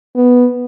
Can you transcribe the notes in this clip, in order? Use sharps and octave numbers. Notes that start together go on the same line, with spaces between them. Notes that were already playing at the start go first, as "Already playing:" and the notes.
B3